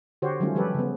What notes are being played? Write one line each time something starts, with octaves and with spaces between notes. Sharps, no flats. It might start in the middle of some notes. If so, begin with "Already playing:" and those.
D3 F#4 G4 C5 C#5
D#3 F#3 G3 A3 C#4 F4
F3 G3 G4 A4 B4
C#3 B3